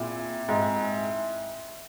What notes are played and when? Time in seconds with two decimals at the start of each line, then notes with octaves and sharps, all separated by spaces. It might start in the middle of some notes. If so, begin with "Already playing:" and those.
Already playing: A#2 C4 E4 G#4
0.48 G#2 C4 E4 G#4